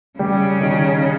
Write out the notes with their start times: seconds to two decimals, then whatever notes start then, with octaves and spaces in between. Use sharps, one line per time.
0.19 C#3 G3
0.61 D#3